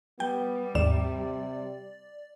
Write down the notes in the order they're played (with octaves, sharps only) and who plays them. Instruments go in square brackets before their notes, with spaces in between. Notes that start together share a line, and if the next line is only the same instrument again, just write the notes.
[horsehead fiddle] G3 [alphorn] B3 [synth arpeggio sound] G5
[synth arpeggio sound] D#2 G#2 E7 [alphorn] C3 [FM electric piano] D5